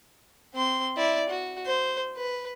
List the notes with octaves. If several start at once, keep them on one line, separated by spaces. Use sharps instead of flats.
C4 C6
E4 D5
F#4
C5
B4